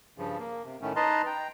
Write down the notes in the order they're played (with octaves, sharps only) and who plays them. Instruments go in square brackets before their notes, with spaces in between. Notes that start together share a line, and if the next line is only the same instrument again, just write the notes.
[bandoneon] G2 C#3 F3
A#3
C3
A2 D#3 A3 C#4
D#4 B4 D#5 A5 A#5 C6
G5 A#5